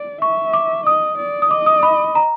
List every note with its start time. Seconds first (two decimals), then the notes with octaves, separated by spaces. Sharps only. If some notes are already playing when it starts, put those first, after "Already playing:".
Already playing: D5
0.21 E5 C#6
0.53 D6
0.86 D#5 D#6
1.18 D5
1.42 D#6
1.51 D#5 D6
1.66 D#6
1.83 B5
2.15 A#5